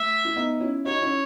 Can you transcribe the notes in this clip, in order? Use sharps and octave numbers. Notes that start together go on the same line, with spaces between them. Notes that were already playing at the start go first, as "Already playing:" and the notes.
Already playing: A3 E5
E4
B3 D#4
C#4 E4
D#4 F#4 C#5
D#4
C#4 E4